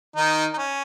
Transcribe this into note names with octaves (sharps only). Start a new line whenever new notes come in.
D#3 D#4
D#4
C#4